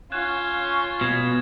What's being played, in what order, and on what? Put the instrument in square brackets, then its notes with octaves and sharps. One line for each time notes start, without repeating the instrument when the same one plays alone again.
[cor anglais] C#4 [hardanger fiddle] F4 [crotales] F#6 G#6 E7
[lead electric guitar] B2 [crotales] G#6 E7